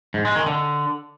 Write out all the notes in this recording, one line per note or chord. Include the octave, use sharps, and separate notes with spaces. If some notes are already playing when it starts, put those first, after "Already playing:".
G#2
G#3
D#3
D3